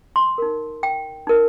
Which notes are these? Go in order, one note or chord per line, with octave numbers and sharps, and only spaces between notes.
C6
D#4 A#4
G5
D#4 A#4